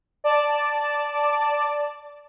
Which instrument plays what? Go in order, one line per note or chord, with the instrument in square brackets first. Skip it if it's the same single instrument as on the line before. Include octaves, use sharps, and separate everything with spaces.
[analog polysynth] D5 A5